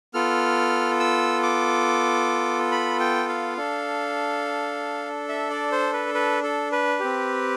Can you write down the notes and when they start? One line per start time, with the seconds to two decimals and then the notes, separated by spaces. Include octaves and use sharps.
0.14 B3 F4 A4 F6
1.00 E6
1.43 D6
2.72 B5
3.00 G5
3.29 F5
3.57 D4 A4
5.29 E5
5.50 D5
5.72 C5
5.93 B4
6.14 B4
6.43 A4
6.72 B4
7.00 C4 G4